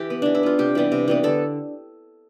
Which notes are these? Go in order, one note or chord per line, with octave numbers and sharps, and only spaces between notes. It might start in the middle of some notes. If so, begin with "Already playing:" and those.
Already playing: E3 G4
B3
E3 D4
E4
B3 F4
C3 G4
E3 G3 B3
C3
E3 G3 B3
D3 A4